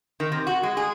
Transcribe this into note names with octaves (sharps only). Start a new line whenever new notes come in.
D#3
C3
F#4
G#3
G#4